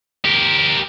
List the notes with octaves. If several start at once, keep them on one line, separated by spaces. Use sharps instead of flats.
G4 A#4